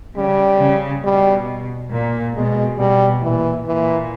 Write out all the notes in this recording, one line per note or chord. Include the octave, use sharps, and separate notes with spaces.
C#3 G3
C#3
B2 G3
A#2
B2 G#3
B2 G3
A#2 E3
A#2 E3